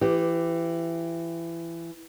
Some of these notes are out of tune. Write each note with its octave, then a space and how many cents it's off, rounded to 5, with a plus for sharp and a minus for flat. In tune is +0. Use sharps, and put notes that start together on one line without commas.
E3 +25 G4 +0